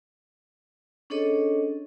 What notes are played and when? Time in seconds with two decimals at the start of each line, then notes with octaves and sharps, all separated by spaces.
1.10 C#4 D4 G#4 A4 C#5 D#5